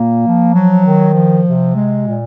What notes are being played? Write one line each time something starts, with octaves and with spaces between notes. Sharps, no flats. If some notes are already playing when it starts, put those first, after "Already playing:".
Already playing: A#2 A#3
F3
F#3
D#3
F3
C3
G#3
A#2